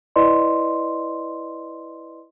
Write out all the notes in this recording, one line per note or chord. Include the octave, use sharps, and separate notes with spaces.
E4 B4 D5 D#5 C6